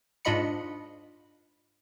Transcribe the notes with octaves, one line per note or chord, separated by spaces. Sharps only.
G#2 D4 F4 D#5 B5 C#7